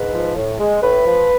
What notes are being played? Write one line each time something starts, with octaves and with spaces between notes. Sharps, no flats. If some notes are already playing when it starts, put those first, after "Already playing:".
Already playing: G#2 B4
F3
A2
G#3
A2 B4
F3